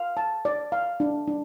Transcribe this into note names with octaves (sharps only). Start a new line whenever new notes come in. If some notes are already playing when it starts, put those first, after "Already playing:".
Already playing: F5
A5
D5
F5
D4
D4